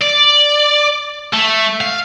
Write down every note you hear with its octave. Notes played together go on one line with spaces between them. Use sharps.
D5
A3
F5